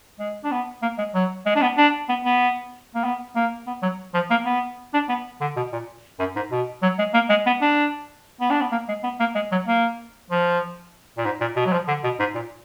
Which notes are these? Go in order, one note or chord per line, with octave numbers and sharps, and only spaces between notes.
G#3
D4
B3
A#3
G#3
F#3
G#3
D4
B3
D4
B3
B3
A#3
B3
A#3
B3
F#3
F3
A#3
B3
D4
B3
D3
B2
A#2
F#2
G#2
B2
F#3
G#3
A#3
G#3
B3
D4
B3
D4
B3
A#3
G#3
B3
A#3
G#3
F#3
A#3
F3
A#2
G#2
A#2
B2
F#3
F3
D3
B2
G#2
A#2